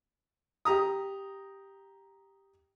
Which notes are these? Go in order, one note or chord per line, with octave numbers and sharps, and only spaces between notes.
G4 A#5 D#6